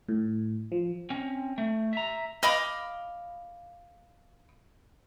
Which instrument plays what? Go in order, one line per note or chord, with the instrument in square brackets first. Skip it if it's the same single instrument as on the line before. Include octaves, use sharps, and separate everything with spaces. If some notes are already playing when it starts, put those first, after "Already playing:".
[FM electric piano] A2
F3
[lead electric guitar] C4 C#4
A3
E5 A#5
[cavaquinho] D#5 F5 B5 D6